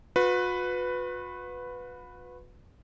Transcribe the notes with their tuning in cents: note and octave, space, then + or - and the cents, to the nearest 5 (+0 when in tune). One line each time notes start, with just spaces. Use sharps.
F#4 -45 B4 +5